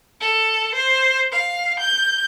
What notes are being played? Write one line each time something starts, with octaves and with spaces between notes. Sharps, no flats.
A4
C5
F5
G6